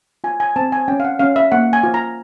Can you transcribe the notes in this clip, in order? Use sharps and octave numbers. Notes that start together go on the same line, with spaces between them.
F4 G#5
G#5
C4 A5
G#5
C#4 G5
F5
F#5
C#4 F5
E5
A#3 F#5
G#5
F4
A#5